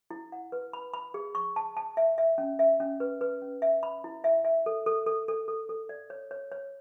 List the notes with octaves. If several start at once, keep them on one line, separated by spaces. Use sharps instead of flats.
E4
F#5
B4
B5
B5
G#4
C#6
A5
A5
E5
E5
C#4
E5
C#4
B4
B4
C#4
E5
B5
E4
E5
E5
A4
A4
A4
A4
A4
A4
D5
C#5
C#5
C#5